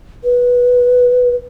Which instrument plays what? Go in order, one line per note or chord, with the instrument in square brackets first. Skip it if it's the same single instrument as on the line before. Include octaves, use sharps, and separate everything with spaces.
[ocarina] B4